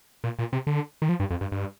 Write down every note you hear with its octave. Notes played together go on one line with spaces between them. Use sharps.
A#2
A#2
C3
D3
D#3
F3
G2
F2
G2
G2